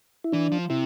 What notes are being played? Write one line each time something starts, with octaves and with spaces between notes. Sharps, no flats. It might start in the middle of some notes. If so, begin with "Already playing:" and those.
E4
E3 D4
F3
C3 E4